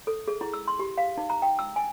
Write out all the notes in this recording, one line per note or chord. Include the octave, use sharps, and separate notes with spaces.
A4
G#4
E4
E6
C6
G4
F5
D#4
A#5
G5
E6
G#5